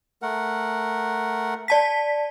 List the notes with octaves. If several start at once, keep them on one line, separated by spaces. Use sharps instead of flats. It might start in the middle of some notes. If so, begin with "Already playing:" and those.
A3 A#4 F#5
D5 A5 B6